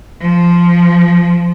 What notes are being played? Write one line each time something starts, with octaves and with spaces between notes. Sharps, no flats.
F3